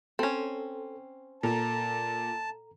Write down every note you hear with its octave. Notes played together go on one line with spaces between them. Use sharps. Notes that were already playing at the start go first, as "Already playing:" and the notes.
C4 C#4 A4
A#2 A4 A5 A#5